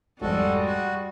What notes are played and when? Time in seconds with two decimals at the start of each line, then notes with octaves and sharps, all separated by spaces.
0.21 G#1 F2 G3 G#3 F#4 A4
0.66 F#4